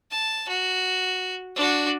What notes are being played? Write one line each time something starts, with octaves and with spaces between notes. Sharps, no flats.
A5
F#4
D4 F#4